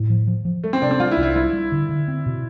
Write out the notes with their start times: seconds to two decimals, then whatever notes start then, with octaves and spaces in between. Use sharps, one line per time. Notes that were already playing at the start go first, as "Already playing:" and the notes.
Already playing: A2
0.10 F3
0.27 F3
0.45 F3
0.64 G3 A3
0.73 C4
0.82 C3 D4
0.91 C4
1.00 G3 F4
1.11 E4
1.17 C2
1.23 E4
1.35 G3 E4
1.53 G3
1.72 D3
1.89 D3
2.08 C4
2.26 B2